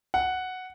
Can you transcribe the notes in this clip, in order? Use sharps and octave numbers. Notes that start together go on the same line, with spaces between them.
F#5